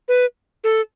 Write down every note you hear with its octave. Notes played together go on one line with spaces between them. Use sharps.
B4
A4